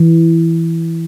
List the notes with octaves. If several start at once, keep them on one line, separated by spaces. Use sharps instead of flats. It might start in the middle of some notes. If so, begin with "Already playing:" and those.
Already playing: E3